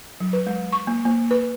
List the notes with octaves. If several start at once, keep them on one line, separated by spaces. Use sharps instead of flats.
F#3
B4
G#3
C#6
A#3
A#3
B4